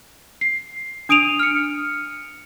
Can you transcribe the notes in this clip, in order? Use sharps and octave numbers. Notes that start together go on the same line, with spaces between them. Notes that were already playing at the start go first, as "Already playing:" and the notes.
C7
D4 D#6 D7 D#7 F7
F6 C#7